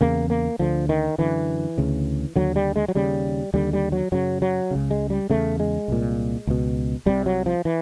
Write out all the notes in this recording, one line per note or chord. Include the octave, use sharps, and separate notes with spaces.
E2 C#3 A#3
A#3
D2 D3 F3
D#3
F#2 D3 E3
D2 C#3
D#2 D3 F#3
G3
G#3
F#3
D#2 C#3 G3
D#2 D3 G3
G3
F#3
F#2 C#3 F#3
F#3
C#2 C#3
G#3
G3
E2 C#3 A3
G#3
C2 A#2
C#2 B2
C2 C3 G3
F#3
F3
E3